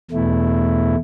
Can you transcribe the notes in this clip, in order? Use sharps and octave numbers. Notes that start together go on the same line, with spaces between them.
E2 B2 A3 E4